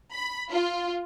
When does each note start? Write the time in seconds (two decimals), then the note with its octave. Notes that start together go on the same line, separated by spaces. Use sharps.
0.14 B5
0.51 F4